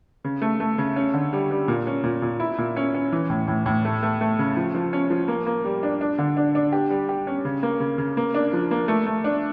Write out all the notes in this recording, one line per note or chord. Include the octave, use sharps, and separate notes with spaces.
C#3
A3
A3
C#3
C#4
D3
G3
G3
A#2
C#4
A#2
A#2
E4
A#2
C#4
C#4
E3
A2
A2
A2
A3
A3
A3
C#3
F3
F3
C#4
F3
A#3
A#3
G3
D4
D4
D3
D4
D4
G4
G3
G4
C#4
C#3
A#3
C#3
C#3
A#3
D4
F3
A#3
A3
A3
D4